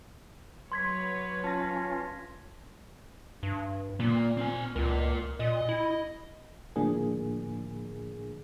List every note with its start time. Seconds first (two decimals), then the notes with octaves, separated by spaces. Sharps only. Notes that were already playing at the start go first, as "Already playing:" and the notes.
0.72 F#3 B4 C#5 C6 G#6 B6
1.44 C#4 F4 A5 A#6
3.43 G2
4.00 A#2 A#3
4.37 C4 G#5
4.76 C#2 F4 A#4
5.40 A#2 D#5
5.69 E4
6.76 A2 D3 F3 A#3 D4 G#4